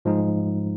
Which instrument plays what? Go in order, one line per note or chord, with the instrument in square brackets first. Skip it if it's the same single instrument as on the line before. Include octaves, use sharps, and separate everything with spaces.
[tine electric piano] G#2 F3 G#3 D#4